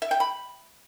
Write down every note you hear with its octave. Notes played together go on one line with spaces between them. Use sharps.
E5
G5
B5